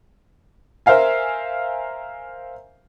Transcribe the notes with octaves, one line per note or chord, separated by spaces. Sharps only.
A#4 C5 E5 F5 G#5